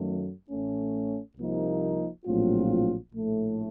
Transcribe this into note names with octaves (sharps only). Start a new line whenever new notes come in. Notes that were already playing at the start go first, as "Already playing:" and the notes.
Already playing: F#2 D#3 F#3 A3
A1 A2 A3 C#4
C2 C3 F3 A#3 D#4
A#1 A2 F#3 C4 F4
A#1 A2 A3